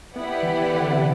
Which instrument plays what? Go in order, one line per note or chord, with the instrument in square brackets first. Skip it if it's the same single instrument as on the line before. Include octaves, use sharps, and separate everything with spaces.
[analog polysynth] B3 [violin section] E4 G4 B4 D5 F#5
[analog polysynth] E3
D3
C3